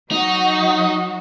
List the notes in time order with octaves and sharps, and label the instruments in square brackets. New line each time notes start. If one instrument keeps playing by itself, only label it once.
[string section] F#3 F#4 [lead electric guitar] D#4